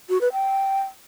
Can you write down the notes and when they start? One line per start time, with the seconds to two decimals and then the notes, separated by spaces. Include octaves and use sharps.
0.09 F#4
0.21 B4
0.33 G5